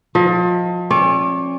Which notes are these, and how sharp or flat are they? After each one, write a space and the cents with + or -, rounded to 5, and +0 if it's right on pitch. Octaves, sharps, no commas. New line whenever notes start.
F3 +30 D#5 +30
C#4 -40 D5 -30